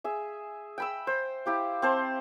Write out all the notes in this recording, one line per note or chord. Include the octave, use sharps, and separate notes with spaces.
G#4 E5
G5 B5 E6
C5
E4 G4 F5
C4 C5 A5